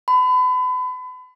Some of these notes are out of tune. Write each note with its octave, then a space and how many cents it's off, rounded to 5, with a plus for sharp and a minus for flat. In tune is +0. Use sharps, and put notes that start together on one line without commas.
B5 +35